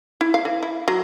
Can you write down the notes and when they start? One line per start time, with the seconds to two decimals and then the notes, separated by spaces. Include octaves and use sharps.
0.21 E4
0.34 F5
0.45 E3
0.63 E4
0.88 F#3